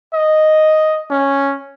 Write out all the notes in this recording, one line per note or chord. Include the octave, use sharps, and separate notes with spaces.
D#5
C#4